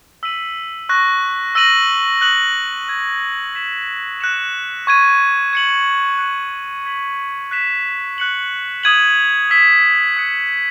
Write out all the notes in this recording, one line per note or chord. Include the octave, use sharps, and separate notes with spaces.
E6 B6 D#7 F#7
C#6 F#6 A#6
E6 A#6 D#7 F#7
D#6 F#6 C#7 F#7
E6 G#6 D#7
G#6 B6 E7
F#6 A#6 C#7 E7
C#6 G#6 D#7
G#6 C#7 F#7
F#6 C#7 F#7
G#6 B6 F#7
F#6 B6 E7
F#6 C#7 F#7
D#6 G#6 D#7 F#7
E6 B6 E7
D#6 F#6 C#7 E7